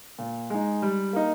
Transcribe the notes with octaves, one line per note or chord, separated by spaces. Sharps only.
A#2
G#3 D#4
G3
A#3 D#4